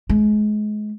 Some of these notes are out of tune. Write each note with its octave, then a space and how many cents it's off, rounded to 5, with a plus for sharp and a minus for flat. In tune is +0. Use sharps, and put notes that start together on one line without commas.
G#3 +30